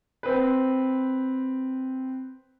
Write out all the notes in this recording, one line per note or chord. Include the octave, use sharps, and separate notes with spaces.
C4 B4